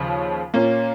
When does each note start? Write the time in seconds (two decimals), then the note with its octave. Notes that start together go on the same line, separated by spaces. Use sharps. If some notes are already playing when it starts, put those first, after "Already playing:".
Already playing: D#2 C#3 F3
0.54 A#2 A#3 C#4